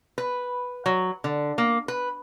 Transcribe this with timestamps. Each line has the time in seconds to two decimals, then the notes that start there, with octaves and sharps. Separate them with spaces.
0.18 B4
0.86 F#3
1.24 D3
1.58 A#3
1.88 B4